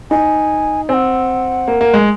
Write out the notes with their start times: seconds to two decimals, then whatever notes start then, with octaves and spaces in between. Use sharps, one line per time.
0.11 D#4 G#5
0.89 C4 G#5
0.93 F#5
1.68 A#3
1.81 A#3
1.94 G#3